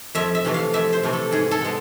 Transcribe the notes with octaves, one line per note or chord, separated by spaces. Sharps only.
F2 E5
E5
C3 E3 A3
F5
F2 E5
C5
C3 E3 A3
A4
G#2 G#4
A4
G#3 B3